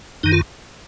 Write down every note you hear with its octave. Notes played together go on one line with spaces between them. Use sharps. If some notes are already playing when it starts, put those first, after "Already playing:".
F#2 D#3 D#4
F4